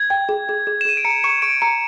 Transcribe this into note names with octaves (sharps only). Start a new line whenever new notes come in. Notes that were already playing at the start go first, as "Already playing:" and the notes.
Already playing: G#6
G5
G#4
G#4
G#4
E7
G#4 D#7
D7
A#5 C#7
C#6 C#7
C#6 D7
A#5 C#7